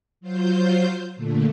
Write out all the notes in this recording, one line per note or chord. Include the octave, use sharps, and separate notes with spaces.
F#3 F4 C5 G6
A#2 D3 A3